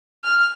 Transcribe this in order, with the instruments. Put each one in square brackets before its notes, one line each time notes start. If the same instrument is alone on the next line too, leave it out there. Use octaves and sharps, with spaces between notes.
[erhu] F6